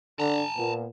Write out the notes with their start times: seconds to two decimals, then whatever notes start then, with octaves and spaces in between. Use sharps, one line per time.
0.19 D3 D4 A5 A#5
0.57 A#2 B3